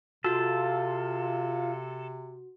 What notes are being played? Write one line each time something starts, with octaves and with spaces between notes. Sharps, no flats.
C3 F4 F#4 A4